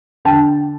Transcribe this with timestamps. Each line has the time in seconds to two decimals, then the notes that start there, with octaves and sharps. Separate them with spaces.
0.25 D3 G5 A5